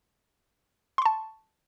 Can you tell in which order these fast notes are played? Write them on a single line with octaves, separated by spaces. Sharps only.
C6 C#6 A5